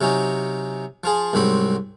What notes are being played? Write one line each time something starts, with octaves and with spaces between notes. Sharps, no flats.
C3 F#3 C#4 D#4
F3 F4 G#4
C2 G#2 F#3 C4 B5